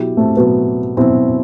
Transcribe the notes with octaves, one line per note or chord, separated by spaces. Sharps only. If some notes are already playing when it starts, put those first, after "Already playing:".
Already playing: B2 F#3 E4 G4
A3 C4
B2 F#3 B3
B2 F#3 C4 E4